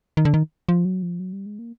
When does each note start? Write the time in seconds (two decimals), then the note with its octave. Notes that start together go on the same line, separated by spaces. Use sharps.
0.17 D#3
0.25 D3
0.34 D#3
0.69 F3
0.85 F#3
1.03 F3
1.20 F#3
1.33 G3
1.46 G#3
1.59 A#3